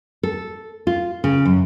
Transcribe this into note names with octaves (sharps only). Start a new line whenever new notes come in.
A4
F4
C#3
F#2